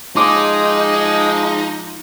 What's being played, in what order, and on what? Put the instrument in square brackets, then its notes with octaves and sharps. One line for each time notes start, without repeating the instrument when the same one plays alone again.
[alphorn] F3 [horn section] G#3 [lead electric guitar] D#4 [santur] C6 D6